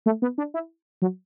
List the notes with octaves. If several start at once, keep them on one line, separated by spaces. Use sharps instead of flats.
A3
B3
D4
E4
F#3